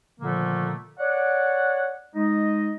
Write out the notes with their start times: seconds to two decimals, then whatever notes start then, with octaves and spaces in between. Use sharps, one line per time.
0.21 A#2 D3 D#3 F3 A3 A#3
0.99 C#5 D5 F#5
2.15 G#3 D#4 D#5